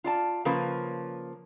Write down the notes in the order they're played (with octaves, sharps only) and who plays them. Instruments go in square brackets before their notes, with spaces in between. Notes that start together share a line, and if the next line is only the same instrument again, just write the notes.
[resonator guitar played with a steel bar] F4 D5 A5
C#3 F3 A#3 B4